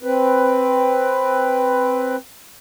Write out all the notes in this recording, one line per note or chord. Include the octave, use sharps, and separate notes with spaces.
C4 B4